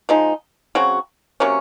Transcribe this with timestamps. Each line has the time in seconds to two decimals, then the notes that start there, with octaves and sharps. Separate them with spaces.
0.09 F3 G#3 D#4
0.75 C#3 F#3 C4 F#4
1.40 C3 F#3 A#3 C#4